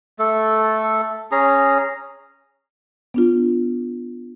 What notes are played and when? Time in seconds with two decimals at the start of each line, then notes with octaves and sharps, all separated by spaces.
0.19 A3 A4
1.32 C#4 G#4 A#5
3.14 B3 D4 F4